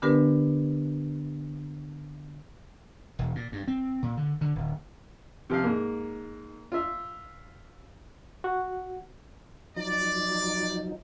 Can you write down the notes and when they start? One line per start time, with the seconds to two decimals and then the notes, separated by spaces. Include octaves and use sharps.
0.02 D3 B3 D4 G4 A#4 B4
3.19 E1
3.35 A#2
3.52 G2
3.68 C4
4.03 A#2
4.17 D3
4.41 D3
4.55 D1
5.50 C3 F3 F5
5.64 G#2 A#3
6.72 F4 E5
8.44 F#4
9.76 F3 F#3 D#4 D5